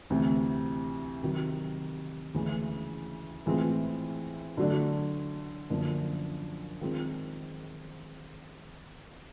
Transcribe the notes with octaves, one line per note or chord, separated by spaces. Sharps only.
D2 C3 E3
C3 D#3 F#3
D2 C#3 E3 G#3 C#4
A2 E3 G#3 C4 F4
D3 F#3 A3 D4
F#2 D3 F3 A#3
D#3 G#3 C4 F4